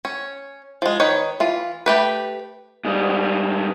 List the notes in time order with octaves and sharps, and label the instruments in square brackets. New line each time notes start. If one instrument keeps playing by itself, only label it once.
[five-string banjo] C#4
F3 G#3
D#3 D#4 B4 C#5
E3 F4
A3 G4 B4
[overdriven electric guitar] G#2 G3